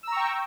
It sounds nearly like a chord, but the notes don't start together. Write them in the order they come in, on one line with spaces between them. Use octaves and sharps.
E6 A#5 C#6 G5